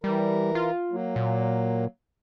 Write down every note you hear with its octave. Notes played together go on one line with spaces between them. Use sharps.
E3 G3 A#4
F4
F#3 A#3
A#2